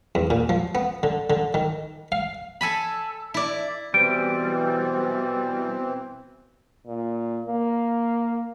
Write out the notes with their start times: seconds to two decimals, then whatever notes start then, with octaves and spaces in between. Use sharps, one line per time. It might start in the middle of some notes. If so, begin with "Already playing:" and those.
0.15 E2
0.30 A#2
0.49 F3
0.75 B3
1.03 D3
1.30 D3
1.54 D#3
2.12 F5
2.61 A4 G#5 B5
3.34 E4 D5
3.94 B2 E3 G3 C4 D7
6.87 A#2
7.47 A#3